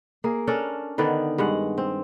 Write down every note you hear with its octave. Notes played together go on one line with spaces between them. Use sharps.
A#3 G#4
C#4 D4 A4 A#4
D3 D#3 B3 D5
G2 G#3 F#5
C4